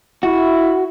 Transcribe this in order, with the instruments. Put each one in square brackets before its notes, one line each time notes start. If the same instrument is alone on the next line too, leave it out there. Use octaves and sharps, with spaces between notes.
[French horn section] E4 [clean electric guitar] F#4